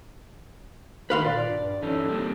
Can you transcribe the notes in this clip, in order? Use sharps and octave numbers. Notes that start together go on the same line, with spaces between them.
D#3 B4 F5 C6
A#2 D5
G2
E3 C#4 D#4 A4
G3 A#3 C4